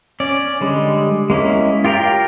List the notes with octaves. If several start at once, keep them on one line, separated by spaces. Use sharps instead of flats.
C#4 D5
D3 G3 G#3
G#3 A#3 C#4 E4
F4 G4 A#4 F5 G5